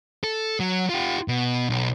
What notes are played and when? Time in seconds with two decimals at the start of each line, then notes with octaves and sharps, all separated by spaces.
0.24 A4
0.60 F#3
0.90 F4 G4
1.28 B2
1.70 B1